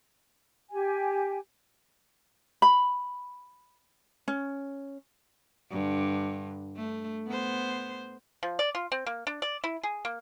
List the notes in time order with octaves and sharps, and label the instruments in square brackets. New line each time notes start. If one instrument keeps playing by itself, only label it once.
[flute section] G4 G#5
[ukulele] B5
C#4
[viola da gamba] G2 D3
A3
B3 C5
[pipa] F3
D5
F4
C4
A#3
D4
D5
E4
G#4
A#3